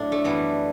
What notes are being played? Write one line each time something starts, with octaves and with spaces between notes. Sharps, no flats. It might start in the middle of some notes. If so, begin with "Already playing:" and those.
Already playing: A2 F#3 D4 E4
A3
F#2 E3 G3 B3